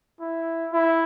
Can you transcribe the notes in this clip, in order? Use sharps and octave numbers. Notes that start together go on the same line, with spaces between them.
E4
E4